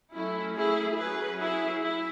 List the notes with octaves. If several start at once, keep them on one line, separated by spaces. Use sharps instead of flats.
F#3 A3 C#4 E4
E4 G#4
F#3 C#4 G#4 B4
E4 G#4
E4